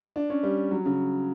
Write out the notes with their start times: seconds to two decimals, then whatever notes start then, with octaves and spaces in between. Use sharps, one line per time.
0.16 D4
0.30 C#4
0.43 G3
0.71 F#3
0.85 C#3